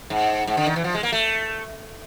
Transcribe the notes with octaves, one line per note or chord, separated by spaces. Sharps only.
G#2
G#2
D3
D#3
E3
F3
G#3
A#3
A3